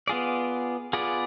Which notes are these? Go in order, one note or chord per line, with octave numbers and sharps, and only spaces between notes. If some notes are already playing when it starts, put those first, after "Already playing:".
B3 F4 G#4 D5
B3 F4 G#4 D5